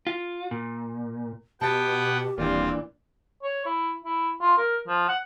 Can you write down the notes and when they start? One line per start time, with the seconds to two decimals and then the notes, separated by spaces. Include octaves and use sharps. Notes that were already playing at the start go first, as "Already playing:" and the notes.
0.07 F4
0.51 A#2
1.61 B2 B3 G4 F#5 G5 A5 A6
2.38 D#1 A#2 E3 C4 D4 F4
3.43 C#5
3.66 E4
4.04 E4
4.41 F4
4.58 A#4
4.88 F3
5.08 F#5